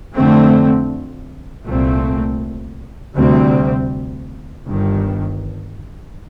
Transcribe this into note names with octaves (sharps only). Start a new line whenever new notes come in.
F2 D3 A3 C4
C2 A#2 A3 C4
D2 C3 G3 C4
G1 G2 D#3